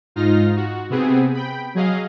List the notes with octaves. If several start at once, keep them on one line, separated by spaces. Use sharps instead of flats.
G#2 D#4 F4 F6 A#6
F#4
C3 B3 C4 G#4
G5 B5
F#3 G#4 D#5 F5